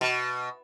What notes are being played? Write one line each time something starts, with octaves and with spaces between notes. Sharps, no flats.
B2